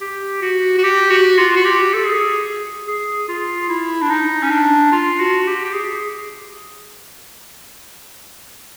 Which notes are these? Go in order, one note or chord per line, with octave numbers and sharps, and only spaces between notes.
G4
F#4
F#4
G4
F#4
F4
F#4
G4
A4
G#4
G#4
F4
E4
D4
D#4
C#4
D4
F4
F#4
G4
G4
G#4